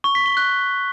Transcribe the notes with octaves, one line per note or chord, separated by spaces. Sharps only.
C#6
B6
G7
F#6